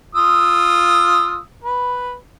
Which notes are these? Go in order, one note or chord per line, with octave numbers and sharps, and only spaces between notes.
F4 D#6 E6
B4